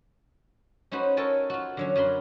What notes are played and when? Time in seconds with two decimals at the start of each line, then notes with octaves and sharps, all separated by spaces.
0.92 C#4 D#4 F#4 B4 C5
1.17 A4 A#4 C#5 G#5 A5
1.50 F4 F#4
1.77 D3 F#3 C#4
1.96 F#2 F#4 A#4 B5 C6